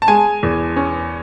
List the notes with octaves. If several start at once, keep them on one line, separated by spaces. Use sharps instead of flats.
A5
G#3 G#5
E2
C#4